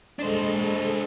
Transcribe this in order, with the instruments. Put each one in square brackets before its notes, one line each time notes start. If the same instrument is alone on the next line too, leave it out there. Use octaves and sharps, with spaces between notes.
[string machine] G#3 A4 D#5 [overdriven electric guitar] D4 C5